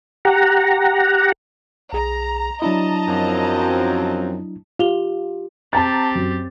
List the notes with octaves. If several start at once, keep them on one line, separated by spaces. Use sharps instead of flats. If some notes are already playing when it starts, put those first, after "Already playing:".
G4 F#5 A#5
B1 G#4 A#5
F#3 D4 E4 D#5 A5 A#5
F#2 F3 C4
F4 G4 F7 G7
C4 G4 A5 A#5 A6
F#2